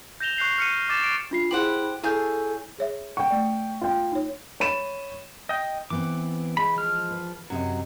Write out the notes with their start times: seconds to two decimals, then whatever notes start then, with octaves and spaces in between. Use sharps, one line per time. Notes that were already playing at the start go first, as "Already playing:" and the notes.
0.20 G6 A#6 E7 F7 G7
0.37 C#6 F#6 G6 C7 F7
0.58 F6 C#7 D#7
0.89 D6 A6 E7
1.03 D7
1.31 D4 F4 C7
1.51 E4 G4 G#4 C5 F#5 F#7
2.04 E4 G#4 A4 C#5 F5 G6
2.78 G#4 C#5 E5
3.17 F#5 G5 C#6
3.30 A3 D5
3.81 F4 G5
4.12 D#4 C#5
4.60 C#5 B5 D#7 E7
5.49 D#5 G5
5.90 E3 B3 C4 D6
6.57 G#3 B5
6.76 F3 F6
7.11 B4
7.50 F#2 C3 F#3 D#5